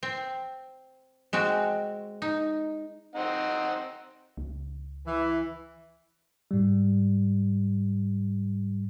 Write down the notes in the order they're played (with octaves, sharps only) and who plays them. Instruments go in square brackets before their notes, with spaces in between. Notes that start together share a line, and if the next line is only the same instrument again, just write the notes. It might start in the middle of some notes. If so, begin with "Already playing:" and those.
[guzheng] C4
G#3 C4 F#4
D#4
[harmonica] C4 D#4 F#5
[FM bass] C#2
[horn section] E3
[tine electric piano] G#2 G3